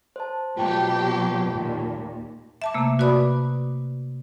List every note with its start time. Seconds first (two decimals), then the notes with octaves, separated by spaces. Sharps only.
0.16 C5 A5
0.57 B2 F#3 F4 G4 G5 A5
1.49 D#2 A#2
2.62 E5 A5 D6
2.74 C3 A3 A#3
2.99 F#4 B4 D5 B5 D6 D#6